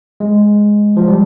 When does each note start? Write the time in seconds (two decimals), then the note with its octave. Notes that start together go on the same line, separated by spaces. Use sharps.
0.20 G#3
0.97 F3
1.08 G3